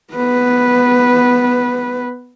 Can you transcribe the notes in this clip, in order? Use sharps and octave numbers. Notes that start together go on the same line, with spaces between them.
B3 B4